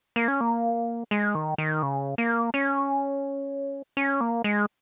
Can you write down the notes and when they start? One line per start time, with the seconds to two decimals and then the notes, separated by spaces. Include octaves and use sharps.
0.16 A#3
0.28 C#4
0.41 A#3
1.11 G#3
1.35 D#3
1.58 D#3
1.83 C#3
2.18 A#3
2.54 C#4
3.97 C#4
4.21 A#3
4.44 G#3